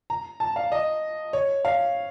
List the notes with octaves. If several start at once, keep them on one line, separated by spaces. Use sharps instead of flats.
A#5
A5
F5
D#5
C#5
F5